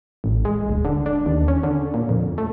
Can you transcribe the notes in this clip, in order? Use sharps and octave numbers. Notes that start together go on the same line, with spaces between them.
A1
G#3
D1
D3
D4
D#2
C#4
D3
A#2
F2
A3